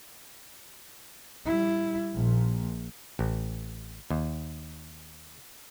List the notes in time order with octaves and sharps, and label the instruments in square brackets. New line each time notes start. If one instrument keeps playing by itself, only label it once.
[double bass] G3 E4
A#1 A#2
[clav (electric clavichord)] A1
D#2